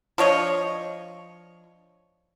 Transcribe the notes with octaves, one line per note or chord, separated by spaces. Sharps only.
F3 D4 C#5 D#5